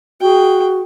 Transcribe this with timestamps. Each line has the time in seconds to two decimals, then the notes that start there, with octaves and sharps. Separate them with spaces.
0.21 F#4 G#4 G5